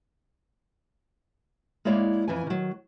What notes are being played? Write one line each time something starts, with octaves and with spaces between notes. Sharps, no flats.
G#3 A#3 E4 C#5 D5
F2 E3 G#5
D#3 F#3